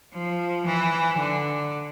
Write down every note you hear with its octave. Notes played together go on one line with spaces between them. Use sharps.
F3
E3
D3